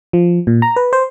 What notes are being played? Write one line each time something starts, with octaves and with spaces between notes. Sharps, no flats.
F3
A#2
A#5
B4
C5